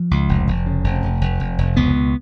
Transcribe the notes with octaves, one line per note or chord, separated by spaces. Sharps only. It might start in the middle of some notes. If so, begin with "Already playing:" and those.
Already playing: F3
C#2
F1
F1
C#3
F1
F1
F1
F1
F1
C#2 B3
B2